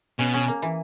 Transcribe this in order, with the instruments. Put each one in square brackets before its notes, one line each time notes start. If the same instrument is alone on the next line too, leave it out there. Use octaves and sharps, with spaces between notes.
[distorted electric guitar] B2 [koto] C#4
[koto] C#4
A#3
E3